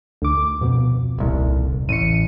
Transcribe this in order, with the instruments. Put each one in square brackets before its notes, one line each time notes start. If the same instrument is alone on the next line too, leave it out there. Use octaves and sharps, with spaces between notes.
[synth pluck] D2 D6
F2 B2
[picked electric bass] D#1 C2
[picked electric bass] A1 [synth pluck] C#7 D#7